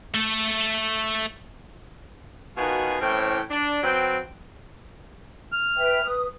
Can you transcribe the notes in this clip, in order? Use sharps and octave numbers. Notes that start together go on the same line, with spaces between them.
A3 A4
B2 D#3 F4 F#4 B4 G#5
A2 E3 C4 C#4 G5
D4
F#3 C4 B4 G5
F6
B4 E5 G5
B4 D#6